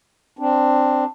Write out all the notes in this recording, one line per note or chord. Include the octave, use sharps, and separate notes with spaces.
C4 D4